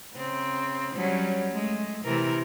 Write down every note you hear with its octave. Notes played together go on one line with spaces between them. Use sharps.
C#3 C4
F#3 G3 C#4
G#3 A3
C3 E3 A#4